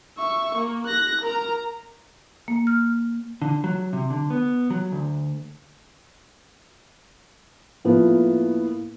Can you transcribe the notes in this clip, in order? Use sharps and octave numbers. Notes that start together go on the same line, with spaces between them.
E5 C#6
A#3
F#6 A#6
A#4 A#5
A#3
F6
D3
F#3
C3
D3
B3
F#3
D2
A2 F3 A#3 B3